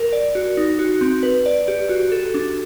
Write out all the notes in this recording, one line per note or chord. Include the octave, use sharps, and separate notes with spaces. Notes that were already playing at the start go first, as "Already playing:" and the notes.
Already playing: A#4
D5
F#4
D#4
F#4
C4
B4
D5
G4
F#4
A4
D4